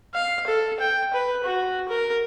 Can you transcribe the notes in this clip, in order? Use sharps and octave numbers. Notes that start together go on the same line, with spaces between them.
F5
A4
G5
B4
F#4
A#4